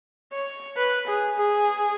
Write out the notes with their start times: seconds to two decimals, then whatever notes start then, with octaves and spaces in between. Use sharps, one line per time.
0.33 C#5
0.77 B4
1.07 G#4
1.37 G#4